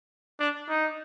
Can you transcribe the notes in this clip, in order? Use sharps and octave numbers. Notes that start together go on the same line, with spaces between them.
D4
D#4